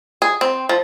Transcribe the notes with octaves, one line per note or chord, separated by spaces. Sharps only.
G#4
C4
F3